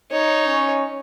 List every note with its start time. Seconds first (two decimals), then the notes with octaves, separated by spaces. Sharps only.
0.12 D#4 C#5
0.47 C#4